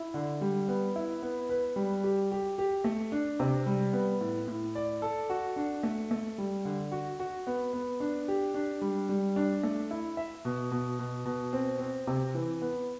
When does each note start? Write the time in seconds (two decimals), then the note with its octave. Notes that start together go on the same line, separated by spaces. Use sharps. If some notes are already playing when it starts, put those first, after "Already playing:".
Already playing: E4
0.14 D3
0.41 G3
0.68 B3
0.96 E4
1.23 B3
1.49 B4
1.76 G3
2.04 G4
2.31 G4
2.58 G4
2.84 A3
3.12 D4
3.40 C3
3.66 G3
3.93 B3
4.21 A2
4.48 A2
4.75 D5
5.02 A4
5.30 F#4
5.56 D4
5.83 A3
6.11 A3
6.38 G3
6.65 D3
6.92 F#4
7.19 F#4
7.47 B3
7.73 B3
8.00 D4
8.28 G4
8.54 D4
8.82 G3
9.09 G3
9.36 D4
9.63 A3
9.91 E4
10.17 E5
10.45 B2
10.71 B2
10.99 B2
11.25 B2
11.53 C4
11.80 C4
12.07 C3
12.34 E3
12.62 B3